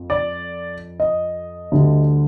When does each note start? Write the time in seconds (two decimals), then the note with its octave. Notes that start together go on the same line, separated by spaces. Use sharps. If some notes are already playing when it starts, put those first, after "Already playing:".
Already playing: F2
0.10 D5
1.00 D#5
1.72 D2 D3 G3